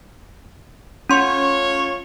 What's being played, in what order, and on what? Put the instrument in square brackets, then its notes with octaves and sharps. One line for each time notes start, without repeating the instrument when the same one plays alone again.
[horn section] A3 F4 C#5 [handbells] C#4 C6